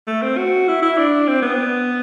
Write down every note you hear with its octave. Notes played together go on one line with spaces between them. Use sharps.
A3
C4
F#4
E4
E4
D4
C4
B3